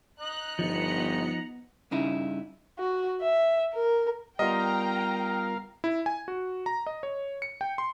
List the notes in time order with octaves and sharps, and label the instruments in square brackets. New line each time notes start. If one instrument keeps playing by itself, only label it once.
[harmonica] D#5 A#5 [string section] F#6
[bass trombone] G1 [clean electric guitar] F3 D#4 [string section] B3 F#6 C#7
[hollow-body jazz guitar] G2 C#3 D#4 E4
[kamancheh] F#4
E5
A#4
[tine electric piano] G3 B3 F4 [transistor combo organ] A#4 F5 [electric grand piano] D#5 [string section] G5 A#5
[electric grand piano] E4
G#5
F#4
A#5
D#5
C#5
C#7
G5
C6